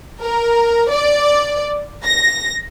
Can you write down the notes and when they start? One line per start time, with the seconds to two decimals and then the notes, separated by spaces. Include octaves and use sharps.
0.21 A#4
0.91 D5
2.05 A#6